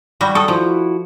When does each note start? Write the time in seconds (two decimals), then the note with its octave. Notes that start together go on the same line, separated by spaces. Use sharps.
0.21 G3 F#4
0.35 A4 C#6 D#6
0.48 F3 E4 F#4